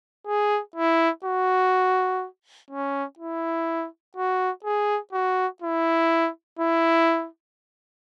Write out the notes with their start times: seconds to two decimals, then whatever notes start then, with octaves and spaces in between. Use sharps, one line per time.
0.27 G#4
0.76 E4
1.24 F#4
2.70 C#4
3.19 E4
4.17 F#4
4.64 G#4
5.13 F#4
5.62 E4
6.59 E4